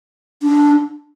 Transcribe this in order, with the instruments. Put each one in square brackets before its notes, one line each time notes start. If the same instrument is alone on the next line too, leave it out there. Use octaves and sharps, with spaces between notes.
[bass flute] D4